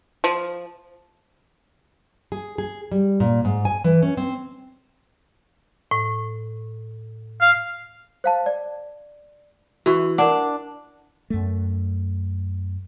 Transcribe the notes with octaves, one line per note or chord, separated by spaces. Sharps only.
F3
G#4
G#4
G3
A#2
G#2
G#5
E3
C#4
C4
A2
F5
C5 F5 A5
D5
E3 F#4 C#6
D4 A#4 D5 F#5
F#2 A3